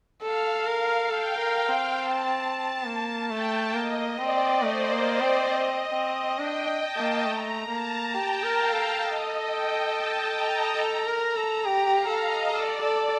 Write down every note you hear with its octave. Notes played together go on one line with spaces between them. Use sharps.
A4 F5
A#4 F5
A4 G5
A#4
G5
C4
A5
A5
A#3 A5
A3 G5
A#3 D#5
C4 D5
A3 C5
A#3
D5
C4
C4 D#5
C4
D4 G5
A5
A#3
A3 A#5
A#3 A5
G4 G5
A#4
F5
A4
D#5
G5
A5
A#5
A4
A#4
A4
G4
F5
A4
D#5
A4 D5
A4